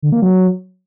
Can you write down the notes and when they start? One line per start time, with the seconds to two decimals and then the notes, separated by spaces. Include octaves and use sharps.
0.02 D3
0.12 A#3
0.22 F#3